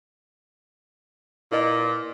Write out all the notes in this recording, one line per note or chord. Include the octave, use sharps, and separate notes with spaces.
A#2 E4 B4 D#5